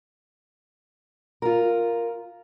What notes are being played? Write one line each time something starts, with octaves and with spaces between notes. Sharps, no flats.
F4 A#4